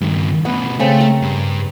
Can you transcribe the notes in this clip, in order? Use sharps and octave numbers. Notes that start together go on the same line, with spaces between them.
G2 D#3
D2 B2 B3
C#3 A3 C4 A5
A#4
G2